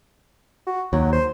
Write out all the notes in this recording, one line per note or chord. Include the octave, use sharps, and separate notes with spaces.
F#4
D#2 F#3
C5